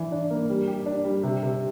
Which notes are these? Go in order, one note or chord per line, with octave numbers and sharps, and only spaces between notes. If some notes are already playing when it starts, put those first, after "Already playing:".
Already playing: E3 D4
D4
A#3
G3
G4
D4
G3
C3
C3